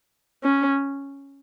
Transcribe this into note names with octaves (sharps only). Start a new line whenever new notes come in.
C#4